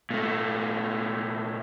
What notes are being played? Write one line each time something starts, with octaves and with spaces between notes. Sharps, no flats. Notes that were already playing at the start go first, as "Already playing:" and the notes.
A#2 A3